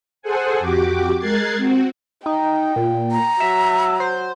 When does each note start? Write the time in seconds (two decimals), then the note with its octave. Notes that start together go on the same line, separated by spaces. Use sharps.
0.22 G#4 A4 C5 F#5 G#5
0.60 F2 F#4 G4 D6
1.18 G#3 A#4 F#6 G#6 A6 C7
1.57 C4 F#4
2.26 D#4 G5
2.76 A#2
3.11 A#5
3.40 F#3 E5
4.00 C5